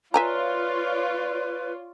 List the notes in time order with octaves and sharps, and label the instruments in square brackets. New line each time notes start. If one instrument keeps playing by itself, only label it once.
[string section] F4 C#5 D5 [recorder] B4 [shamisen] E5 G#5 A#5